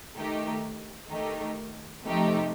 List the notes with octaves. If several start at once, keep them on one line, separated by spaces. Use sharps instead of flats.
D#3 A3 D#4 G4
D#3 A3 D#4 G4
C3 F3 A3 D#4 G4